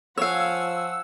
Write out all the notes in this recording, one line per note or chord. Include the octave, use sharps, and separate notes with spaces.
F3 C#5 F5 F#5 G#5 E6